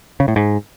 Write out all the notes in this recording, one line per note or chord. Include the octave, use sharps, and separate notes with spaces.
C#3
A2
G#2